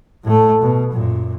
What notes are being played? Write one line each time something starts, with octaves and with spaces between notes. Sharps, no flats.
A2 A3
B2
F#2 A#2